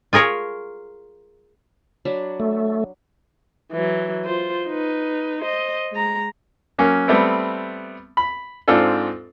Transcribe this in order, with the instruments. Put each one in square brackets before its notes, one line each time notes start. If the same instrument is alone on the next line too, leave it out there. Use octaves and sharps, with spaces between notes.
[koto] F4 G#4 A#4 C#5
[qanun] F#3 D4 B5
[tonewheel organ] A3
[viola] E3 F#3
F4 C5
D#4 B4
C5 D#5
G#3 A#5
[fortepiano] F#3 A#3 C#4
G3 A3 B3 C4
B5
G#2 C4 D4 F4 A4